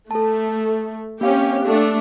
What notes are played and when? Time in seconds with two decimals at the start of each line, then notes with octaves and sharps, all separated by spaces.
0.11 A3 A4 A5
1.21 A#3 C4 C#4 G4 F5 G5
1.66 A3 D4